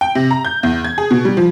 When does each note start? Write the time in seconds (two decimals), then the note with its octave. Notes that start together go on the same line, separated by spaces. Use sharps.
0.01 G5
0.15 C3
0.31 A#5
0.45 G6
0.63 E2
0.84 G#6
0.98 G#4
1.11 B2
1.25 G3
1.37 F3